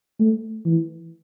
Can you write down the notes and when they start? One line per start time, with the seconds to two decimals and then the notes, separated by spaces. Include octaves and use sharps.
0.20 A3
0.65 E3